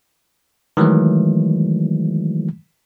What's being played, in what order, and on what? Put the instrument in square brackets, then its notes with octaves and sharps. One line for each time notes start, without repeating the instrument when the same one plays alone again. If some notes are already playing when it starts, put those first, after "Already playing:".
[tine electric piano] D#3 E3 F#3 G#3 A3